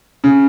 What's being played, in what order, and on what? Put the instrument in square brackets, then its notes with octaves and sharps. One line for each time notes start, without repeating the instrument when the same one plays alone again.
[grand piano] C#3